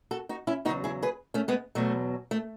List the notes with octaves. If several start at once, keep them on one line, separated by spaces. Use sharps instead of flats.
F#4 A4
D#4 F#4
C#4 E4
E2 C#3 F#3 D#4 F#4
E4 G#4
G#4 B4
A3 C#4
G#3 B3
E2 B2 F#3 A3
A3